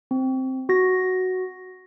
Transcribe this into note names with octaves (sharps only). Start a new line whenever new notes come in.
C4
F#4 A#6